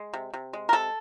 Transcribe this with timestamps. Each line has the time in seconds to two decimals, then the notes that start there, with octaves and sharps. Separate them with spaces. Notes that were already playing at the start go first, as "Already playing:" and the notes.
Already playing: G#3
0.14 C3
0.34 C3
0.53 G#3
0.69 A#4
0.73 C3 A4